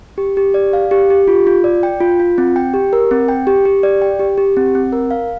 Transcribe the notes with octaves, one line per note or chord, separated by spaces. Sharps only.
G4
G4
D5
F5
G4
G4
F4
F4
D5
G5
F4
F4
C4
G5
G4
A#4
C4
G5
G4
G4
D5
G5
G4
G4
C4
C4
A#4
F5